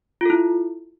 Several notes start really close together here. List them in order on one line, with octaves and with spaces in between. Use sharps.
F4 A4 E4